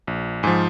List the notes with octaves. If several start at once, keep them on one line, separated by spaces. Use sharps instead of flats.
A#1
G#2 F3 G#5